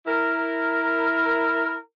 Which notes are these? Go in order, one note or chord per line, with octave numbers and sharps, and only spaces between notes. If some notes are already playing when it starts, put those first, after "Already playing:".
E4 A#4